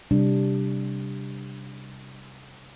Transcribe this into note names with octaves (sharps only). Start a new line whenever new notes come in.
C3 G3 D4